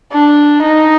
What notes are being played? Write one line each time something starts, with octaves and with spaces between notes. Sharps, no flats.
D4
D#4